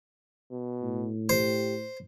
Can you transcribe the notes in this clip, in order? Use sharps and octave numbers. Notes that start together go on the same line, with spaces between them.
B2
A2
G4 C5